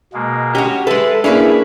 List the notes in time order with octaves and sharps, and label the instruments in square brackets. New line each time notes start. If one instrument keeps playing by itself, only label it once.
[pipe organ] B2 G#3 A#3
[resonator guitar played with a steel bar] C#4 F#4 [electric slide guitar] G4
[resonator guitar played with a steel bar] G#3 B4 [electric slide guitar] A4 [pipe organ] E5
[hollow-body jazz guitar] A#3 D4 [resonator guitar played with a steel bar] C#4 E4 B4 [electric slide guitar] G#4 [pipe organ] B5